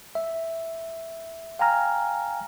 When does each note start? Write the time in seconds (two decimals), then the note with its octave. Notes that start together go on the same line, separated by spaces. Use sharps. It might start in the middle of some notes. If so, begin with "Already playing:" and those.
0.15 E5
1.59 F5 G5 G#5 A#5 F6